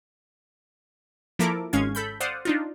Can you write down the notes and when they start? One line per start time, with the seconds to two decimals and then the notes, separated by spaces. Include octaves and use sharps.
1.39 F3 A#3 E4 A4 A#4 D6
1.73 G#1 G#3 C#4 F5 G#6
1.95 A4 B5 G6
2.20 C5 D5 F5 F#5 D#6
2.45 D4 D#4 F4